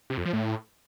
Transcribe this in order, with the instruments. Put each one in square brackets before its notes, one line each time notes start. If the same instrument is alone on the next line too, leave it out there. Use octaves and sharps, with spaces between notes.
[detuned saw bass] C3
F2
F3
A2